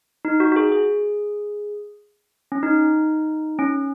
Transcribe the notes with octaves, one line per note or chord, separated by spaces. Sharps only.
D#4
F#4
F#4
G#4
G#4
C#4
D#4
C#4